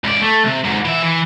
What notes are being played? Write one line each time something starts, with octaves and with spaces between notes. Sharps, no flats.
C#2 D5
A3
C3
G#2 F#3
E3 E5
E3